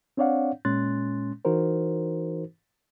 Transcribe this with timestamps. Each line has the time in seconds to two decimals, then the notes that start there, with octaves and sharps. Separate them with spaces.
0.17 C4 D4 C#5 D5 F5 F#5
0.65 A#2 G#3 C#4 C6 F#6 A6
1.45 E3 D#4 F#4 A#4 C5